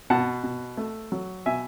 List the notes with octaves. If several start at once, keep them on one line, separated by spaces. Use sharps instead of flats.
B2 F#5 A5
B2
A3
F#3
B2 E5 G#5